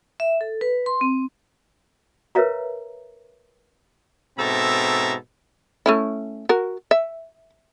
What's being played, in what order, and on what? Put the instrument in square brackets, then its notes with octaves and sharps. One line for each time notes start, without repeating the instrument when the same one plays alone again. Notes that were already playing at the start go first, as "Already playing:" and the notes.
[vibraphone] E5
A4
B4
C6
C4
[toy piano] A#4 B4 C#5 E5 F5 A#5
[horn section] G#2 B2 C4 A4 E5 A#5
[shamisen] A3 C#4 E4
F#4 A#4
E5